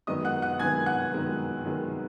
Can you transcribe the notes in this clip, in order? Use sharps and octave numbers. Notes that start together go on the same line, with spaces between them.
F#2 D#3 G#3 B3 D#5 D#6
F#5 F#6
F#5 F#6
F#2 D#3 G#3 B3 G#5 G#6
F#5 F#6
F#2 D#3 G#3 B3
F#2 D#3 G#3 B3